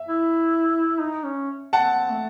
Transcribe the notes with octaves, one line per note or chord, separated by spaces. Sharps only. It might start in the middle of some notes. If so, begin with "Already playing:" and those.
Already playing: E5
E4
D#4
C#4
C4 F#5 A5
A3